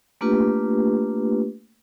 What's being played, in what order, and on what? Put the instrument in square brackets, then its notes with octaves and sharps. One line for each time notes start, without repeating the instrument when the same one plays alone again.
[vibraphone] A3 A#3 D4 F4 G4 B4